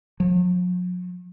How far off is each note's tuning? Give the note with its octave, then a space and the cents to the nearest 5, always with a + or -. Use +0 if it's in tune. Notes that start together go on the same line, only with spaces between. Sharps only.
F#3 -45